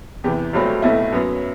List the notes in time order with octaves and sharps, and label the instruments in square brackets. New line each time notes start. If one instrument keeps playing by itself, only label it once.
[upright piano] E2 C3 E3 G4
G1 G2 F#3 A3 C4
B1 B2 A3 C4 E4
F#2 F#3 B3